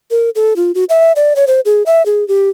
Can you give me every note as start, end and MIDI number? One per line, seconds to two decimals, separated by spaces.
0.11 0.30 70
0.35 0.56 69
0.56 0.72 65
0.75 0.84 66
0.89 1.12 76
1.16 1.33 74
1.36 1.45 73
1.47 1.60 72
1.65 1.83 68
1.86 2.05 76
2.06 2.26 68
2.28 2.49 67